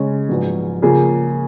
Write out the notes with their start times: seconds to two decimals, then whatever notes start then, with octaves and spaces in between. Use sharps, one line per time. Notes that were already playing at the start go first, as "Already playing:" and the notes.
Already playing: C#3 G#3 C#4
0.29 A#1 G#2 F#3 B3
0.82 C#3 F3 A#3 F4 G#4